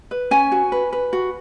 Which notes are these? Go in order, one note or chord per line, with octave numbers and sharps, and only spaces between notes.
B4
C#4 G#5
F#4
B4
B4
F#4